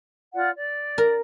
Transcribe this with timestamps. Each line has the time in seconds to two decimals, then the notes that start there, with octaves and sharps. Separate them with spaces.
0.35 F4 D5 F#5
0.56 D5
0.98 A#4